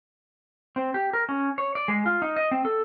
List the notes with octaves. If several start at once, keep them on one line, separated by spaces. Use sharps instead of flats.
C4
G4
A#4
C#4
C#5
D5
G#3
F4
D#4
D#5
C4
A4